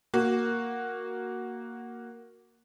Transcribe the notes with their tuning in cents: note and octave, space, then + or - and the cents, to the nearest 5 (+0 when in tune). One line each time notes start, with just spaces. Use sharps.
A#3 +0 F#4 +0